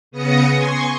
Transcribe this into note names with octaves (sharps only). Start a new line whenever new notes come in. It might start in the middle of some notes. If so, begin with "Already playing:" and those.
C#3 B3 D#6 A#6 C#7
G#5 C6 C#6